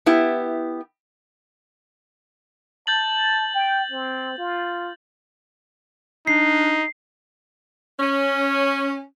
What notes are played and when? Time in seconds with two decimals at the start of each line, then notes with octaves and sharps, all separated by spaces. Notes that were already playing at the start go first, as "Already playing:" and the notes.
0.06 B3 E4 G4
2.87 A5 G6 A6 F#7
3.55 G5
3.92 C4
4.38 F4
6.27 D4 D#4 C7
8.00 C#4